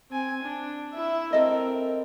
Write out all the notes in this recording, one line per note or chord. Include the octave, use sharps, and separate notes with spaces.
C4 G#5
D4
E4 E5
C4 A4 A#4 D#5